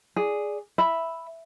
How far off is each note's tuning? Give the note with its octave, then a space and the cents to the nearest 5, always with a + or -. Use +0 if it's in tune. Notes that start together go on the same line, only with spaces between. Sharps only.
G#4 +0 D5 -5
E5 +0 B5 +0